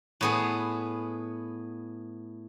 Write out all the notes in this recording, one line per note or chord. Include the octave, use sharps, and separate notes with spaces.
A2 B3 G#4